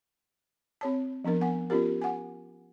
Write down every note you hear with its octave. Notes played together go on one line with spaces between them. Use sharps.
C4 C#5 A5
F3 B3 D4 A#4
B3 F#5 G#5
B3 C#4 F4 G4 A#4
F#5 G#5